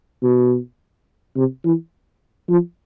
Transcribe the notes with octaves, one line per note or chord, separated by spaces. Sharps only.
B2
C3
E3
F3